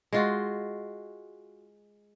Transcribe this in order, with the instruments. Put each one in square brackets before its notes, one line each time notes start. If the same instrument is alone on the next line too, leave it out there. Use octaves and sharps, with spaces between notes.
[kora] G#3 F4 F#4